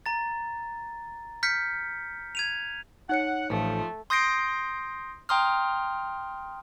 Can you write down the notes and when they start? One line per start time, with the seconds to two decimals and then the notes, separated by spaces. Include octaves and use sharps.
0.06 A#5 A6
1.43 F6 G6 B6 C#7
2.35 G#6 D#7 F7
3.09 D#4 C#5 F#5 C#7
3.50 A1 F3 A3
4.10 C6 D#6 G6 A#6 C7 D7
5.29 G5 A#5 C6 D#6 F6